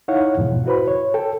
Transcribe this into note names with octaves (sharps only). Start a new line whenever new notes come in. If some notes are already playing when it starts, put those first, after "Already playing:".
D#4 E4 C#5 F5 F#5
E2 G#2 B2 F3
E4 F#4 B4 C5 B5
C#5
A4 G5